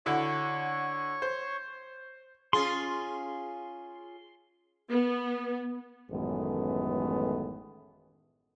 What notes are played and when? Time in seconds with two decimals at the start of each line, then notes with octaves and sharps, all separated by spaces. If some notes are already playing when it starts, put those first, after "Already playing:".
0.06 D3 E4 F#4 C#5 C#6
1.22 C5
2.53 C#4 F4 G#4 C6
4.89 B3
6.11 A1 F#2 D#3 G#3 A3 B3